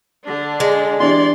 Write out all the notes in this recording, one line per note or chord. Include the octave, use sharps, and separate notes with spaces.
D3 D4
G#3
E3 D4 G4 D5 C6